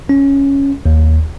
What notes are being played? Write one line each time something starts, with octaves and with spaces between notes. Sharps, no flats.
C#4
D#2